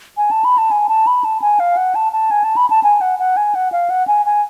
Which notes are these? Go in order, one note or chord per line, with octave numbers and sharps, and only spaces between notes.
G#5
A5
B5
A5
G#5
A5
B5
A5
G#5
F5
F#5
A5
A5
G#5
A5
B5
A5
G#5
F#5
F#5
G#5
F#5
F5
F#5
G#5
G#5